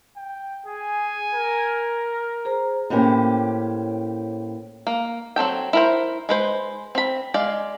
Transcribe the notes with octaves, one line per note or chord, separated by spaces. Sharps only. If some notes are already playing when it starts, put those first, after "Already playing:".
G5
G#4 G#5
A#4
G#4 C5 A#5
A2 A#3 C#4 G4 C5
A#3
F#3 C4 A4 G5
E4 A#4 C5
G#3 B4 C5
C4 B5
G#3 D5 F5